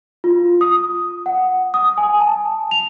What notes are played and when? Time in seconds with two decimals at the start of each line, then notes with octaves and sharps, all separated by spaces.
0.24 F4
0.61 D#6
1.26 F#5
1.74 D#6
1.98 G#5
2.21 A5
2.71 F7